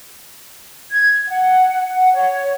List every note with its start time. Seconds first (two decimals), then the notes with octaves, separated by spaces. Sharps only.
0.92 G#6
1.28 F#5
1.95 F#5
2.14 C#5